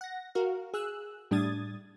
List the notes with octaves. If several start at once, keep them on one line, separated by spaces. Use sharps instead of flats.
F#5 A#6
F#4 A#4 F5
G#4 E6 F#6
A2 G3 D4 D#6 G#6 A6